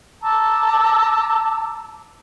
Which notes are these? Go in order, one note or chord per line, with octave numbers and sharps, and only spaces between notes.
A5 A#5 D6 E6